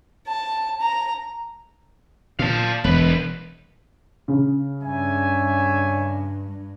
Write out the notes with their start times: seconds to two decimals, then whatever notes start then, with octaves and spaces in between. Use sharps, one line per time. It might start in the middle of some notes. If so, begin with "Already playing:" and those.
0.28 A5
0.81 A#5
2.39 A#2 F5 A5
2.84 E1 C2 B4
4.28 C#3
4.83 G2 C#5 E5 G#5